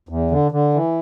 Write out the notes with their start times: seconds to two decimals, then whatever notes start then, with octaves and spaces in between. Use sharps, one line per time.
0.09 E2
0.31 D3
0.51 D3
0.74 E3